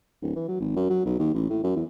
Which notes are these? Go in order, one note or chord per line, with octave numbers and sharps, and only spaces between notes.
D1
E3
F#3
G#1
F#2
F#3
B1
D#2
A1
A2
F#2
E2